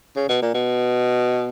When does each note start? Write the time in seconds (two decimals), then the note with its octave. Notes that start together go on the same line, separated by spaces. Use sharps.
0.16 C#3
0.29 B2
0.42 A#2
0.54 B2